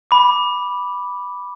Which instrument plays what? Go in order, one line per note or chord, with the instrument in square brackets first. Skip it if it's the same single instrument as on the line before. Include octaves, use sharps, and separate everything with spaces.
[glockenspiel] B5 D6